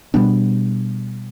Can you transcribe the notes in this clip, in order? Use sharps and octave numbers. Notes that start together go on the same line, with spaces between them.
B2 G3 B3 D4